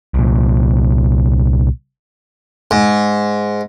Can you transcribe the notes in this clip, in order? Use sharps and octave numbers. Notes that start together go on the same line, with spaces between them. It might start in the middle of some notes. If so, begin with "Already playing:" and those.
C2 A#2
G#2